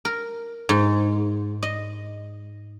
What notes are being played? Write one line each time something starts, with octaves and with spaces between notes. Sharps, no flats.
A#4
G#2
D#5